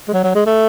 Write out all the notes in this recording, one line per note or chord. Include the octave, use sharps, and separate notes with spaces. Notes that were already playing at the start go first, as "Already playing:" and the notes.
G#3
F#3
F#3
G#3
A3